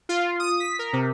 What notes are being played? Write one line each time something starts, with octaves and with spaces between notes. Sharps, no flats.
F4
D#6
B6
A#4
C3